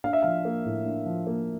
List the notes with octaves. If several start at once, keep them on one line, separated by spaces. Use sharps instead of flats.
D4 F5
E5
F3 F5
A#3
A2
D4
F3
A#3